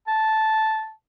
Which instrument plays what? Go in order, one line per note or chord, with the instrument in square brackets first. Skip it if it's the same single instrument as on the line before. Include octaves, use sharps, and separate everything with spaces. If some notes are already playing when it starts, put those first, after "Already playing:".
[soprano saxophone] A5